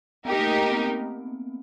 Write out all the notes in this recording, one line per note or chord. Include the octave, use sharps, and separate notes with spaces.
B3 D#4 G4 A#4
A#3
A3
A#3
B3
C4